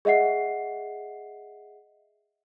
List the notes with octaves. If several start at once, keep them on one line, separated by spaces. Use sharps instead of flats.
G#4 D#5 E5 F#5 C7